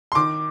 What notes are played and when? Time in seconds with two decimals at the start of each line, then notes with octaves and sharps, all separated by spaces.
0.12 C6
0.15 D#3 D6